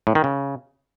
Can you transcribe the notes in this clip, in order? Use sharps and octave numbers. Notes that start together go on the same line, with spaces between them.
A2
D#3
C#3